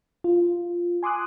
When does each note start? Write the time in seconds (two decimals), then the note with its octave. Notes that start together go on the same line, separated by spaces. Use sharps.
0.24 F4
1.03 G#5 C6 D6 D#6 F#6